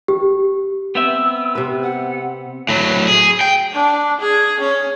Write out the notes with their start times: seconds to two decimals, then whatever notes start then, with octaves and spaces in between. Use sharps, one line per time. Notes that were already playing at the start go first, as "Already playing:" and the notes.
0.08 G4
0.95 B3 C4 E5 E6
1.55 C3 B4
1.83 F#5
2.69 A2 F#3
3.08 G#4
3.41 G5
3.73 D4
4.21 G#4
4.60 C#4